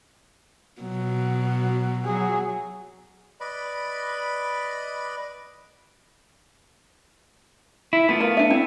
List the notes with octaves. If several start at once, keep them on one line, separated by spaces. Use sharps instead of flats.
B2 F#3
F#3 G#4
B4 D5 D#5 B5
E4
A3 B3 F4
A#4 F5
D4 E5
C4 E4 A4